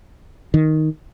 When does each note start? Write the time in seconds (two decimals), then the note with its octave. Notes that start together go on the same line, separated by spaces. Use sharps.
0.54 D#3